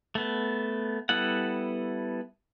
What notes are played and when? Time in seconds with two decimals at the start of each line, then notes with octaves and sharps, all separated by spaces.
0.15 A3 B3
1.09 G3 B3 E4 A4 F#5